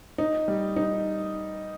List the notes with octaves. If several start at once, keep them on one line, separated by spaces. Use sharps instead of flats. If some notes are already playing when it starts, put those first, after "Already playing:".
D#4
G3
D#4